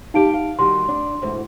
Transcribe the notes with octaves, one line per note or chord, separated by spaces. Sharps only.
D#4 G4 F5 A5 D7
F5
D#3 G3 F#4 C6
D4
D2 G#2 E3